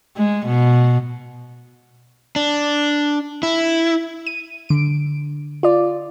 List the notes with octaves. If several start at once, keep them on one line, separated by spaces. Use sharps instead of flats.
G#3
B2
D4
E4
D#7
D3 D7
F4 D5